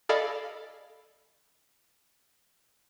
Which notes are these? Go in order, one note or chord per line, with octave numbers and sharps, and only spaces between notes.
A4 D5 D#5 F5 G#5 B5